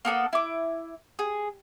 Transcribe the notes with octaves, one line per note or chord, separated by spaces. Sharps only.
A#3 B3 A4 D5
E4 D6
G#4